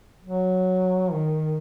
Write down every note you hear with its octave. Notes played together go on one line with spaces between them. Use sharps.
F#3
D#3